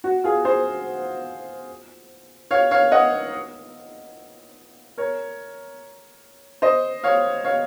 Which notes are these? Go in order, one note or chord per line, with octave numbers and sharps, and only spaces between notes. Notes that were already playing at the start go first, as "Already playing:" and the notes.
F#4
F4 G#4
G#4 C5
C#5 F5
C#5 F5
D#5 F#5
A#4 C#5
C5 D#5
C#5 F5
C#5 F5